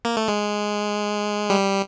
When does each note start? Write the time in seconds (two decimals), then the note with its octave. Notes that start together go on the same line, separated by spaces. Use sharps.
0.05 A#3
0.17 A3
0.28 G#3
1.50 G3